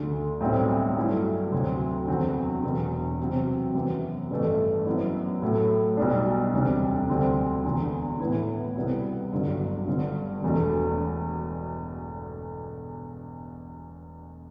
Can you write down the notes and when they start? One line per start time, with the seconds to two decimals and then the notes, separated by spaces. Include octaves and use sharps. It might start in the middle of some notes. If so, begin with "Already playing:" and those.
Already playing: D2 D3 A3
0.41 B1 A2 G3 C4 F#4
0.97 G2 F#3 A3 E4
1.52 D2 C3 F#3
2.08 E2 D3 F#3 C4 F#4
2.63 E1 E2 B2
3.20 C3 F#3 C4 F#4
3.75 F#2 E3 B3
4.31 A1 G2 E3 A3
4.86 F#2 F#3 B3 E4
5.42 A2 F#3 A3
5.97 B1 B2 G3 D4
6.53 E1 D2 C3 G3 D4
7.09 D2 D3 G3 C4
7.64 E1 E2 D3
8.20 A2 E3 B3 E4
8.75 C2 B2 G3 B3 E4
9.32 G1 G2 D3 F#3
9.87 G1 G2 D3
10.42 E1 E2 B2 A3